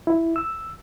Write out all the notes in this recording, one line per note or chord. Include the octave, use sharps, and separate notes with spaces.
E4
E6